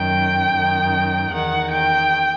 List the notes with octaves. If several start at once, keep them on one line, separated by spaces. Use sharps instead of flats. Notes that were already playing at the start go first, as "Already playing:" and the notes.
Already playing: F#2 D#3 G5
F#2 D#3
E2 D#3 F#5
G5